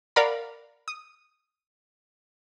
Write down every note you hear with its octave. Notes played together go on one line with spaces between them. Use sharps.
A#4 D5 F5 F#5 A#5 B5
D#6